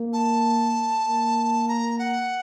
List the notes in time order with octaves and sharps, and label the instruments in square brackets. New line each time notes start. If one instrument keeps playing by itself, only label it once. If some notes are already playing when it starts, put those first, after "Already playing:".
Already playing: [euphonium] A#3
[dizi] A5
[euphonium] A#3
[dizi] A#5
F#5